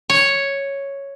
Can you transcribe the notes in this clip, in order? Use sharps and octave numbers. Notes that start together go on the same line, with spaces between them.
C#5